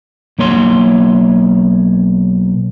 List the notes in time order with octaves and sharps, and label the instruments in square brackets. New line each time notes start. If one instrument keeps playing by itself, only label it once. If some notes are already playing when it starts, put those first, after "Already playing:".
[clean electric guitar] B1 A#3 C#5 C6